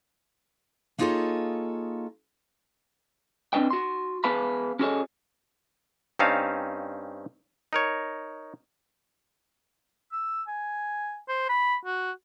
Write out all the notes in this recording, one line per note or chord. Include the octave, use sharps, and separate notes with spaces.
A#3 D#4 F4 G#4 A4 C#5
C4 D4 B4 D#5 G5
F#4 C6
B3 G#4 B4 F5 A5 B5
C#4 F#4 G#4 A4 C#5 D#5
G2 C4 C#4 D#4 F5 A5
D#4 A#4 C#5
E6
G#5
C5
B5
F#4